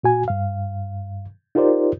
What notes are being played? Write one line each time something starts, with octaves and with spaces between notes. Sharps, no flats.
A#2 F#4 G#5
G2 F5
D#4 F4 G4 A#4 C5 D5